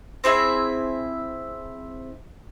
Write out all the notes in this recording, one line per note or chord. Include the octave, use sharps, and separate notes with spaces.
C4 E4 G#4 E5